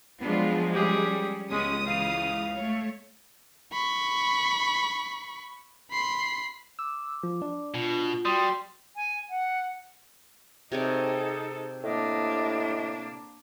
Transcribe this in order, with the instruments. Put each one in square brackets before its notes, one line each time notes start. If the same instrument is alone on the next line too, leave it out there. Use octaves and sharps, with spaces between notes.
[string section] F3 F#3 G#3 [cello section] B3 D4 F4
[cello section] G3 C#4 [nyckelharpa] G4 G#4
[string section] C#2 D#6 [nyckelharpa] G#3 [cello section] B3 C#4
[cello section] C#3 E3 [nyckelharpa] F5
[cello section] A3 C#5
[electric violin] B5 C#6
B5 C6
[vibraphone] D6 [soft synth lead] E6
[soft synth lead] F3
D4
[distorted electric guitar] B2 [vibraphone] F4
[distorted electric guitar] G3 [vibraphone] F#4 G5 [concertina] C6 [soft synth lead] D#6
[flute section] G#5
F#5
[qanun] C3 C#5 D5 [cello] D#4 A4 [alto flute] G#4
[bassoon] A2 [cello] A#3 D4 [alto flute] D#5